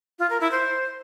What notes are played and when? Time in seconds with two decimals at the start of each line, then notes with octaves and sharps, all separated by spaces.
0.19 F4
0.30 A#4
0.41 E4
0.51 C5